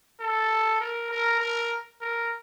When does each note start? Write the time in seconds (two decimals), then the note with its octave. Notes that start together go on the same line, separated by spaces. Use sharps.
0.20 A4
0.80 A#4
1.11 A#4
1.40 A#4
2.01 A#4